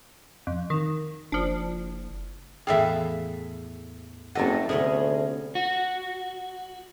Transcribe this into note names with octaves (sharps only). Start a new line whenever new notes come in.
F2
D#3
F#1 F3 D4
E2 A2 G#4 A4 E5 F5 G5
F#1 A3 C4 F#4 A4 D#5 F#5
D2 C3 B3 C#4 G#4
F#4